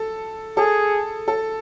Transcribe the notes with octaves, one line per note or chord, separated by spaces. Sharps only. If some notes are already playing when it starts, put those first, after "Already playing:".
Already playing: A4
G#4 A4
A4